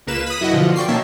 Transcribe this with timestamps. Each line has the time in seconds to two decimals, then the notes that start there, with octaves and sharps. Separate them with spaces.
0.07 C#2 A#3 B4 E7
0.26 B5 D#6
0.40 F#2 E4 F#4 D#5 F#5
0.53 B2 D3 F3 F4
0.76 D5 G5 C#6 C7
0.88 B2 D#3 A#3 C#4 E5 A5